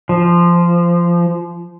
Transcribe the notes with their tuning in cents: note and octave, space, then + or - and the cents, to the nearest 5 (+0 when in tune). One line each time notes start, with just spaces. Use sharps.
F3 -15